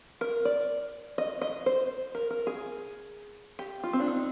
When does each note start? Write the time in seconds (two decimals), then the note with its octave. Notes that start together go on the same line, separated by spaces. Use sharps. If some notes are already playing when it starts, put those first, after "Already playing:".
0.21 A#4
0.45 D5
1.18 D#5
1.42 D#5
1.66 C5
2.15 A#4
2.30 A#4
2.47 G#4
3.59 G4
3.83 F4
3.93 C4
4.00 D4
4.08 D#4